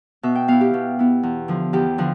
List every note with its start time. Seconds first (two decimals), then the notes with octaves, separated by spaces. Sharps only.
0.23 B2 E5
0.35 G5
0.48 B3 E4 F5
0.61 G4
0.74 B2
0.99 B3 E4
1.23 E2
1.48 D3 F3
1.73 E2 G4
1.98 D3 F3